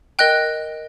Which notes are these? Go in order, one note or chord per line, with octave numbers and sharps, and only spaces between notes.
A#4 D#5 G5 F#6